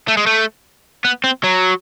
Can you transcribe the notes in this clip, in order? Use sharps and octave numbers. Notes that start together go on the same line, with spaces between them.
A3
G#3
A3
B3
C4
F#3